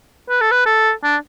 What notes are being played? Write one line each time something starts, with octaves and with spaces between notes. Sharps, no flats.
B4
A4
B4
A4
D4